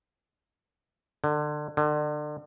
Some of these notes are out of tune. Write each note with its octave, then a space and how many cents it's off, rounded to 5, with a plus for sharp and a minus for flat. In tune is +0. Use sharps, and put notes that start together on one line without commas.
D3 +30
D3 +35